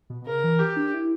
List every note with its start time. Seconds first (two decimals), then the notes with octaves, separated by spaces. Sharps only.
0.10 B2
0.22 B2
0.26 C#3 A#4
0.44 E3
0.59 G4
0.76 D4
0.94 E4